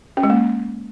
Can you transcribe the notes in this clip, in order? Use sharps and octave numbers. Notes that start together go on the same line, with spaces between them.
C#4
G#3
A#3